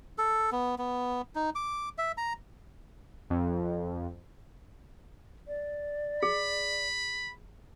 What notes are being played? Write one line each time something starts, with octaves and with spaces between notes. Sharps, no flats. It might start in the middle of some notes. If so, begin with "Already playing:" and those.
A4
B3
B3
D#4
D6
E5
A#5
F2
D5
G#4 B5